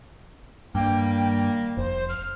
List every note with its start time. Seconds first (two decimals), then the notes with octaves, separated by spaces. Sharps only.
0.75 G2 D#3 G3 A#3 G5
1.77 F1 C5
2.09 F6